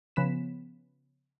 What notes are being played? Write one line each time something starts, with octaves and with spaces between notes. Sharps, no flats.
C#3 F3 B3 B6 E7